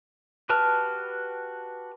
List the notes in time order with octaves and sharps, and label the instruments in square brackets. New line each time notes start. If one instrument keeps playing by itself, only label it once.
[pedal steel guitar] F#4 G4 B4 A5 F6